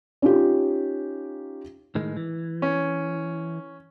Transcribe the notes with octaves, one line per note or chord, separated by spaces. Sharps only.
C#4 D#4 F4 G4
A2 D#3 G#3
E3
C#4